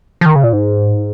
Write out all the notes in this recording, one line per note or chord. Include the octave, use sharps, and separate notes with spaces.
F3
D#3
C#3
A#2
G#2